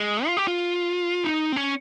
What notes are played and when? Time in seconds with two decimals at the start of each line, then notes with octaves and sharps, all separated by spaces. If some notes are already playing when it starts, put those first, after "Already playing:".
Already playing: G#3
0.26 F4
0.37 G4
0.48 F4
1.24 D#4
1.52 C4
1.56 C#4